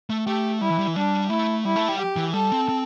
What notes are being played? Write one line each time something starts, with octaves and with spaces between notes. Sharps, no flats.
A3
A3 G4
G3 E4
E3
G3
E3
G3 D4
A3 E4
G3 E4
A3
G3
G4
E3
G3 A4
C4
C4